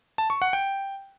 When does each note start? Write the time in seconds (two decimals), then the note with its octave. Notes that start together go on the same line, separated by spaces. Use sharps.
0.18 A5
0.30 C#6
0.42 F#5
0.53 G5